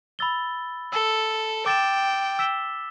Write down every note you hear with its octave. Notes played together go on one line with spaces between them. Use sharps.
B5 E6 A6 G7
A4 E6 A6 G7
G5 D6 A6 E7
E6 B6 E7 G7